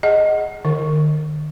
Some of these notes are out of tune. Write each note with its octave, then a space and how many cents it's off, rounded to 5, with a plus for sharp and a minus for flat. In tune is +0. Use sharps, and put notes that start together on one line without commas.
G#4 +0 D#5 +0 F#5 +0
D#3 -45 A#4 -15